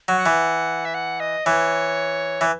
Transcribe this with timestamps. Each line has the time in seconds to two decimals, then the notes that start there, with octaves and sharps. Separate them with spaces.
0.08 F#3
0.17 F#5
0.26 E3
0.85 E5
0.94 F#5
1.20 D#5
1.46 E3 C#5
2.41 E3